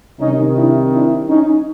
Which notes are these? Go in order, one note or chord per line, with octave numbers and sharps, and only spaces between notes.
C2 C3 D#3 G3 C#4 D#4
D4 E4
D4 E4
C#4 D#4